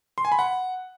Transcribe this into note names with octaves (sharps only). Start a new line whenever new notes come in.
C6
G#5
B5
F#5